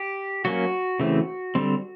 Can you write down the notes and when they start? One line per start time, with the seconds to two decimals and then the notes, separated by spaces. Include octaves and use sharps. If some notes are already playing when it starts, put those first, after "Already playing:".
Already playing: G4
0.45 F#3 A#3 C#4 F#4
1.00 C#3 E3 A3 C4
1.55 D3 G3 C4